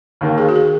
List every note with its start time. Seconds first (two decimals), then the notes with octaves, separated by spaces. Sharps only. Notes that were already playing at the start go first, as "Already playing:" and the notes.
0.21 D#2 D#3 A#3
0.38 G#4
0.49 F#4
0.56 G#4